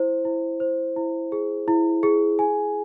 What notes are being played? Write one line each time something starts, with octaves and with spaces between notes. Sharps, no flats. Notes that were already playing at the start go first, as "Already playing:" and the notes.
Already playing: E4 C5
E4
C5
E4
G#4
E4
G#4
G#5